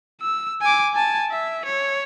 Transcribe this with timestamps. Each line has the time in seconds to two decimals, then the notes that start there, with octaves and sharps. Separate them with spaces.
0.21 E6
0.61 G#5 D6
0.94 G#5 A5
1.31 E5
1.65 C#5